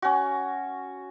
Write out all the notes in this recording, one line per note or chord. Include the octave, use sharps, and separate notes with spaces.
C#4 F#4